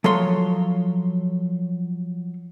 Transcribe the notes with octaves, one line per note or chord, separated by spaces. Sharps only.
F3 F#3 A4 C#5 C6